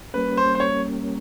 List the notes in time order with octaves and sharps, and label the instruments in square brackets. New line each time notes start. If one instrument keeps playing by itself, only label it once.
[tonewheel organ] G3 A#3 C#4 [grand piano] B4
[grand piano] C5
C5
C#5